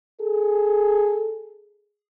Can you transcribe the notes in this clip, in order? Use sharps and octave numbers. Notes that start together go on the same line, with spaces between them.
G#4 A4